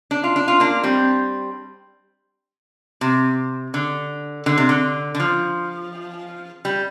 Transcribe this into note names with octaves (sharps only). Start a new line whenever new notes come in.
D4
F4
D4
F4
A#3 D4
G3 C4
C3
D3
D3
C3
D3
D3
F3
G3